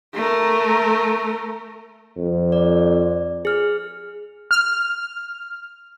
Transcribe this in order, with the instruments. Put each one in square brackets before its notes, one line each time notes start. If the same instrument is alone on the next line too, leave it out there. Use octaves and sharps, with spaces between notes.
[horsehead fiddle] A3 A#4
[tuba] F2
[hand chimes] D5
G#4 F6
[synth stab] F6